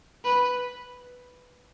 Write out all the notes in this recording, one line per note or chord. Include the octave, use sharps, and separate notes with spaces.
B4